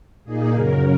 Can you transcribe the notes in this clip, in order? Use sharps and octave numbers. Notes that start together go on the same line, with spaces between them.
A#2 A#3 D#4 G#4
F#2 C#3 F#3 A#4